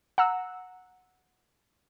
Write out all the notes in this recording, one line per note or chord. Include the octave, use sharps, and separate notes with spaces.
F#5 A#5 E6